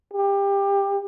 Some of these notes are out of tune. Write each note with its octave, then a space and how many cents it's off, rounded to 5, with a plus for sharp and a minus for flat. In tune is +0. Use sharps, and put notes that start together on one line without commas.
G4 +20